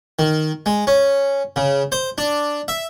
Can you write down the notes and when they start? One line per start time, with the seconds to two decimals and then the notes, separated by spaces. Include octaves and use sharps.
0.19 D#3
0.66 G#3
0.87 C#4
1.56 C#3
1.92 C5
2.18 D4
2.68 E5